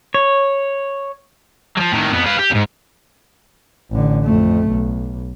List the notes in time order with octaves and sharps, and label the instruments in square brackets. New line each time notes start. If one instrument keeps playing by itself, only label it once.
[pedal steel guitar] C#5
[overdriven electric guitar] F3 F#3
A2 D#3
F2 B3
B4 F5
G4
E2 G#2
[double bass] A1 D3
F2 A3
B1